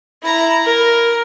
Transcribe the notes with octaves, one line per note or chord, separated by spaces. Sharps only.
E4 A#5
A#4